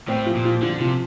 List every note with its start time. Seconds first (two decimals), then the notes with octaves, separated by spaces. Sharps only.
0.08 A2 C4
0.26 F3
0.35 A#2
0.44 F3
0.62 D3 F3
0.80 C3 F3